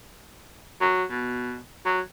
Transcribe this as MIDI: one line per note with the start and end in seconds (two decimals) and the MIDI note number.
0.81 1.04 54
1.10 1.59 47
1.86 2.01 54